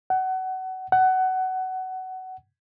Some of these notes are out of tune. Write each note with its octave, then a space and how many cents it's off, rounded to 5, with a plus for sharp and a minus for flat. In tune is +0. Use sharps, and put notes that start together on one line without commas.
F#5 +25
F#5 +20